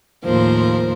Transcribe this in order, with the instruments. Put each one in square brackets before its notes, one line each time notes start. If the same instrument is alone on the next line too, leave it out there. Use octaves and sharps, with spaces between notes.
[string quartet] D#2 A2 F3 A#4 C5